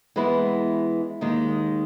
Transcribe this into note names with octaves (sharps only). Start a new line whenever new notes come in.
E3 G#3 B3 E4 B4
D#2 D#3 G#3